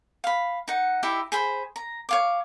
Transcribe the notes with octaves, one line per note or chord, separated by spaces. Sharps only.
F5 B5
D#4 F#5
D#4 E4 G4 E5
G#4 C5 B5
A#5
C#5 F5 D6